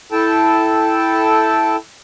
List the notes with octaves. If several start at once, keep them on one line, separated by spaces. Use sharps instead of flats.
E4 A4 G5 A5